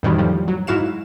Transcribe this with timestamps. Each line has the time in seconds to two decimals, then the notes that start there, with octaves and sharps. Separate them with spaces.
0.03 F2 A2 D#3 E3 F#3 G3
0.18 A2 F3 G3
0.48 F#3
0.67 G#2 E4 F#4 F5 E7